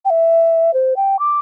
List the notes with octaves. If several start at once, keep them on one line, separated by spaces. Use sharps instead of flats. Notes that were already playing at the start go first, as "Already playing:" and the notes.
G5
E5
C5
G5
D6